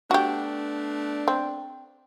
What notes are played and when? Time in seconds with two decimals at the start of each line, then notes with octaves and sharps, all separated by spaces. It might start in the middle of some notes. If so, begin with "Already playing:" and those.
0.11 A3 B3 D4 F#4 G4
1.28 C4